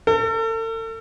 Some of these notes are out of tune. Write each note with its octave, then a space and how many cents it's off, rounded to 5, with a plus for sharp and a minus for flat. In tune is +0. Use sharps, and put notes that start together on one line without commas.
A4 +40